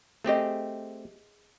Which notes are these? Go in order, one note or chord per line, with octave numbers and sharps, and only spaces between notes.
A3 C4 G4 G#4 D#5